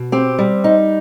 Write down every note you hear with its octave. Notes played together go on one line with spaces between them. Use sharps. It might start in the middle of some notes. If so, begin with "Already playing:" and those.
Already playing: B2
C4 G4
G3
D#4